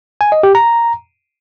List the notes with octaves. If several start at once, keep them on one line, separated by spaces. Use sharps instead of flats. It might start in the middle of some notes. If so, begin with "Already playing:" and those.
G#5
D#5
G4
A#5